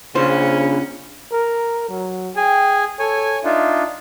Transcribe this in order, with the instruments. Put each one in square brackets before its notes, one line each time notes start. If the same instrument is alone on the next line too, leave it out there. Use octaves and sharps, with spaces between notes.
[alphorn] C#3 [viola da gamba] C#4 [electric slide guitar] D4 F4 [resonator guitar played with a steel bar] C5
[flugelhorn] A#4
F#3
[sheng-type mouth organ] G#4 G#5 [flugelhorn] G5
[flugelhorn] A4 [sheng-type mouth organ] C#5 G#5
[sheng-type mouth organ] D4 D#4 F4 [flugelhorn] E5